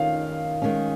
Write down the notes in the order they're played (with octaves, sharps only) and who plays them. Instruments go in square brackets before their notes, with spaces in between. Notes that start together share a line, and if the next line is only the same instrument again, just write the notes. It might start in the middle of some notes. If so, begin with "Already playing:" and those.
Already playing: [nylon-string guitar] D#3 C#4 [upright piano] F5
[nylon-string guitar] D#3 G#3 C#4